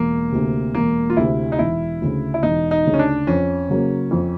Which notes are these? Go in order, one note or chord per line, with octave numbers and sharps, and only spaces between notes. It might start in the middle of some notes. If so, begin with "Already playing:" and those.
Already playing: E1 A#3
D2 C3
E1 A#3
F4
D2 C3 E4
D#4
E1 E4
D2 C#3
E4
E1 D#4
D#4
D2 C#3
C#4
D4
F2 C#4
C#3 F#3 A#3
F2